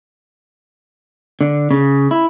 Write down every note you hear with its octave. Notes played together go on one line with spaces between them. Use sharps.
D3
C#3
E4